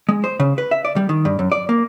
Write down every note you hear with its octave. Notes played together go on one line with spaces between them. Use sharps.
G#3
C5
C#3
B4
E5
D5
G3
D#3
G2
F#2
D5
A#3